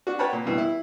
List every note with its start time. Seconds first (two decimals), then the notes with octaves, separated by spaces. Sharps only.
0.07 D4 F#4
0.19 B4 C#5 F#5 G5 A5 B5
0.33 A#2
0.46 G2 B2 E3
0.58 E4